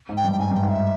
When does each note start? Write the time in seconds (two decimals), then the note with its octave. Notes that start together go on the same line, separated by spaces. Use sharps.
0.09 G#2
0.17 G5
0.25 G2
0.32 G5
0.39 G#2 G#5
0.51 G2
0.55 G5
0.63 G#2
0.70 E5